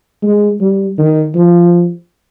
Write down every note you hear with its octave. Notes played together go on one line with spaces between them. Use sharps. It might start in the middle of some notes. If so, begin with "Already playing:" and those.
G#3
G3
D#3
F3